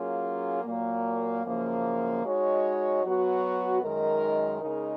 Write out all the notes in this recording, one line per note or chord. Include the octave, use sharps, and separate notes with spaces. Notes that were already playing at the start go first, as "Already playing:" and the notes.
Already playing: F#3 A#3 C#4 F4 G#4
A#2 F#3 A#3
F#2 C#3 F3 A#3
G#3 D#4 F#4 C#5
F#3 B3 F#4
F#2 D#3 G#3 D#4 A#4
C#3 G#3 D#4 A#4